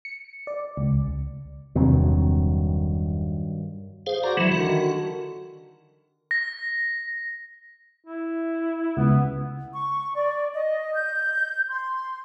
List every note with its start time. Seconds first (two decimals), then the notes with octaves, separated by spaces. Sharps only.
0.05 C#7
0.47 D5
0.77 C#2
1.75 E1 G2 C3 D#3 F#3 C4
4.07 G#4 C5 F5
4.24 F#4 C5 D5 A#5
4.37 E3 F#3 E4
4.52 D3 D#3 F#4
6.31 A#6
8.05 E4
8.97 C#2 B3
9.73 C#6
10.15 D5
10.53 D#5
10.94 G6
11.70 C6